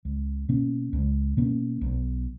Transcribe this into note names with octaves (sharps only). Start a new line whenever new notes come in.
C#2
B2 A#3 C#4
C#2
B2 A#3 C#4
B1